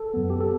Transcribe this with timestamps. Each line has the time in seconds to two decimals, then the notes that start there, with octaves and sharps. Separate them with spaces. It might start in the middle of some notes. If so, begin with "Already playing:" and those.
Already playing: A4
0.14 F#2 F#3 B3
0.30 G4
0.40 A4